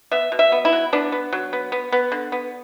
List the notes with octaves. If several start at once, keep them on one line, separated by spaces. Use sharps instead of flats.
B3 E5
B2
E5
B3
E4
F#3
B3 D4
B3
F#3
B3
B3
B3
D3
B3